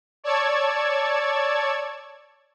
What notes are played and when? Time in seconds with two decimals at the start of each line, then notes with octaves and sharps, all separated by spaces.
0.24 C#5 D5 A5 C#6 E6 G#6